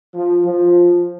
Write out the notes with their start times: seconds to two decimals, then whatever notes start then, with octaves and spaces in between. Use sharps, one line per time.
0.13 F3
0.44 F3